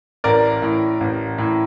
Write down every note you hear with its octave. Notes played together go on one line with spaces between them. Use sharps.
A1 A#4 D5
A2
A1
A2